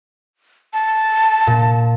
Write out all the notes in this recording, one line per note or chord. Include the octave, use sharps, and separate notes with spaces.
A5
A#2